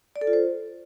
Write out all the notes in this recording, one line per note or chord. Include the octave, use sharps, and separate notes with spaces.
D5
A4
F4
C5